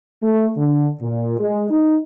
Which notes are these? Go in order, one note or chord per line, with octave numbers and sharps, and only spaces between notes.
A3
D3
A#2
G#3
D#4